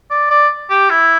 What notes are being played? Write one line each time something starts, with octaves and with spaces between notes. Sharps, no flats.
D5
D5
G4
E4